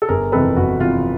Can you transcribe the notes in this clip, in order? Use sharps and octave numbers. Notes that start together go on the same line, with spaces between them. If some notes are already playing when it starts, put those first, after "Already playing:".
A4
G1 G#4 A#4
F2 C3 E3 A4 B4
G1 F#4
F2 C3 E3 F4